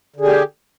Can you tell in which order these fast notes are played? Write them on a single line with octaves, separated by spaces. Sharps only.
D3 G#4 G4